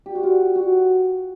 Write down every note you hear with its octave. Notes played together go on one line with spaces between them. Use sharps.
G4
F#4
F4
F#4